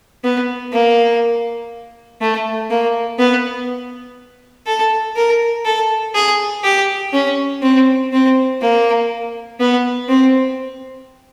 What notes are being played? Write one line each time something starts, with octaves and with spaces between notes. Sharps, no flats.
B3
A#3
A3
A#3
B3
A4
A#4
A4
G#4
G4
C#4
C4
C4
A#3
B3
C4